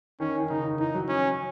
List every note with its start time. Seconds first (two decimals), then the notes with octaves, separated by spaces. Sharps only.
0.20 D#3 C#4
0.40 D#3
0.50 C#3 D#4
0.64 D#3
0.79 E3 D#4
0.94 F#3
1.09 C#4